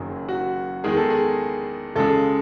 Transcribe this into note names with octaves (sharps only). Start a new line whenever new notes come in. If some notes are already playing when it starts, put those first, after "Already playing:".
Already playing: F#1 F#2 D#3 F#3 G#4
F#4
E2 D#3 G#3 G#4
A4
G#4
C#2 C#3 G#3 A4